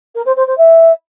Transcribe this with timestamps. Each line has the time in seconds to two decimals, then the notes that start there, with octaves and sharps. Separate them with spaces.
0.15 A#4
0.25 C5
0.36 C5
0.47 C5
0.57 E5